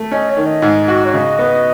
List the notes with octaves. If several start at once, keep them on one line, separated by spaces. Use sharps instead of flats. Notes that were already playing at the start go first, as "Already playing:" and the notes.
Already playing: A3
C#4 D#5
C#5
D#3
D#5
G#2
F#4
C#5
C#3 D#5
B3